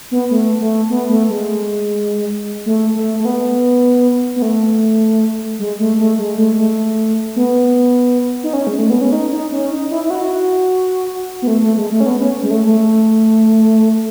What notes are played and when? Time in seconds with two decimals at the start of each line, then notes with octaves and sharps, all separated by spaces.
0.11 B3
0.31 A3
0.61 A3
0.90 B3
1.10 A3
1.29 G#3
2.66 A3
2.95 A3
3.20 A3
3.25 B3
4.36 B3
4.42 A3
5.59 G#3
5.80 A3
5.99 A3
6.19 G#3
6.38 A3
6.58 A3
7.36 B3
8.43 D#4
8.53 C#4
8.67 G#3
8.78 A3
8.90 B3
9.01 C#4
9.12 D#4
9.32 D#4
9.52 C#4
9.71 D#4
9.91 E4
10.04 E4
10.10 F#4
11.42 B3
11.47 A3
11.62 A3
11.77 G#3
11.91 A3
12.00 C#4
12.06 B3
12.20 C#4
12.43 G#3
12.51 A3
12.65 A3